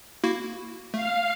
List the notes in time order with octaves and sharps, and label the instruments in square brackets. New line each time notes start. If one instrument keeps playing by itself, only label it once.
[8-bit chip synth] A#3 E4 F#4
[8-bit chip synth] A3 [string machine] F5